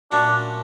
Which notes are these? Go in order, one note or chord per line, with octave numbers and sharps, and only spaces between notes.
A#2 F#3 A3 C#4 D4 F#4